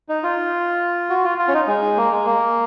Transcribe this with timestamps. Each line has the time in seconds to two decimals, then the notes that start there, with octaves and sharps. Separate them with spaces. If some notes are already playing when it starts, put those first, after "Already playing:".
0.09 D#4
0.23 F4
1.10 F#4
1.24 F4
1.38 F4
1.48 C#4
1.54 D#4
1.68 G#3
1.97 A#3
2.11 G#3
2.26 A#3